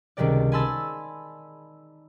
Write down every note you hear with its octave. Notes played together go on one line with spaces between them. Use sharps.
C#2 C3 D#3 G3 G#3 D5
G#5 A5 B5 C6 E6 A6